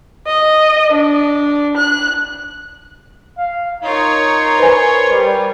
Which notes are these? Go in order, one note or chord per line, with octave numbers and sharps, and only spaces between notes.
D#5
D4
F#6
F5
D#4 F4 A#4 C#5
B4 C5 G#5
G3